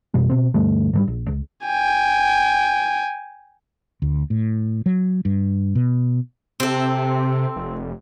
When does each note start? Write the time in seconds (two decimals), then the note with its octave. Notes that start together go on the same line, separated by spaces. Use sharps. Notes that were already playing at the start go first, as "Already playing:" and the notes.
0.14 F2 B2 G3
0.30 B2 C4
0.54 D2 G2 G3 A3
0.93 G#2 F#3 G3
1.07 A#1
1.28 C#2
1.66 G5 G#5
4.02 D2
4.30 A2
4.86 F#3
5.25 G2
5.75 B2
6.60 C3 C4 A4
7.56 F1